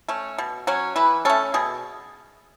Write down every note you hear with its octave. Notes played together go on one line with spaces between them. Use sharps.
A3 C#4
B2
F#3 C#4
E3 B4
A3 C#4 A4
B2 G#4